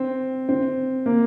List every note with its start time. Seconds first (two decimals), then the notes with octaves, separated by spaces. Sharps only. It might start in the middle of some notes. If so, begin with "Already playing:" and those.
Already playing: C4
0.49 C4
1.06 A#3